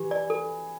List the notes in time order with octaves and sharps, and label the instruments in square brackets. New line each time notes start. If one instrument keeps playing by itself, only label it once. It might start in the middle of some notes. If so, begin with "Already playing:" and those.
Already playing: [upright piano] E3 [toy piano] G4
[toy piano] D5
A4